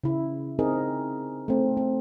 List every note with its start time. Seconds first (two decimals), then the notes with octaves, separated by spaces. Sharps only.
0.03 C#3 E4
0.59 C4 D#4 G#4 A#4 D#5
1.48 A3 C4
1.77 C4